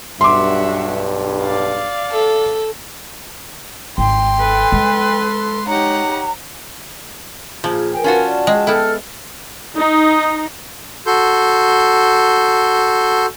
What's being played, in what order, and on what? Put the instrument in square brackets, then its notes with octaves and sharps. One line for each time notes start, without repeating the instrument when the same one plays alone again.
[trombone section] B1 G2 [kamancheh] F#4 E5 [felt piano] C6 D6
[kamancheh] D5 F5
[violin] A4
[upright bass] G#1 [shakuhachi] G5 [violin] C6
[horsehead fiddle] A4 B4
[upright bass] G#3
[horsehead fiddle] D#4 G4 [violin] C#5 F#5 [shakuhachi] A#5
[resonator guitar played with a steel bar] A#2 [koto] F3 [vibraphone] F4 G#4
[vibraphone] A#4 B4 G#5 [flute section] G5
[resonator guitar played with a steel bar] C#4 F4 F#4 [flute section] A5
[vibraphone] D5
[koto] G#3 [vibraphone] G5
[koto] B3 E4 [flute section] A4 A5 F6
[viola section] D#4
[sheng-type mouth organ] F#4 A4 C6 G6